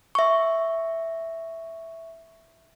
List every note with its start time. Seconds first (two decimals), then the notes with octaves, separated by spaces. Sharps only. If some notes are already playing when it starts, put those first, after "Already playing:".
0.15 E5 C#6